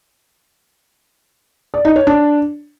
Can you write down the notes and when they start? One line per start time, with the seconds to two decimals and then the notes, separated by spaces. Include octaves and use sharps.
1.74 D5
1.85 D#4
1.96 C#5
2.07 D4